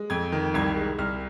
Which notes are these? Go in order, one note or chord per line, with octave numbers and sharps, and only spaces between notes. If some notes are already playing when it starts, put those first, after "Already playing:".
Already playing: G#3
F2 G#6
D#3
C2 G#6
G#3
C2 F6